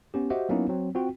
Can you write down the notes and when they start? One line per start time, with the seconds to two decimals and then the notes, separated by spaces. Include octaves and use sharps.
0.14 B3 C#4 G4
0.30 F#4 G4 C5 D#5 E5 F#5
0.49 F#3 A#3 B3 C#4 D#4 E4
0.69 F#3 C4
0.95 C4 F4 F#4 G5